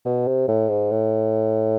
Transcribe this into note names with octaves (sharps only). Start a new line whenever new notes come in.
B2
C3
A2
G#2
A2